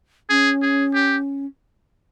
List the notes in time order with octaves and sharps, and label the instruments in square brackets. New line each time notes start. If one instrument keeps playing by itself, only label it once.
[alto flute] C#4 [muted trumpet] G#4
[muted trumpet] G#4
G4